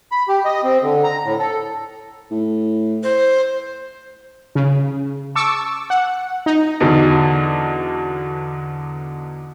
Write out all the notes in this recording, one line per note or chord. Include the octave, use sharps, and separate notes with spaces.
B5
G4
D#5
C4
D3
A#5
A2
A4
A2
C5
C#3
A5 C#6 D6 E6
F#5
D#4
E2 B2 D3 D#4